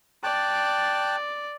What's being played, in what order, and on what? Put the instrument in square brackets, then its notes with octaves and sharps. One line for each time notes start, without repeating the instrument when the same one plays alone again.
[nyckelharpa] D5 [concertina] G5 A5 F#6